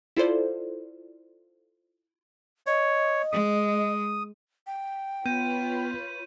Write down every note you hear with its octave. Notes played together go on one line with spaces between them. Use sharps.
E4 F4 A4 C5 D5
C#5 D#5
G#3 D#6
G5
B3 F4 B4 C#5 G6 D#7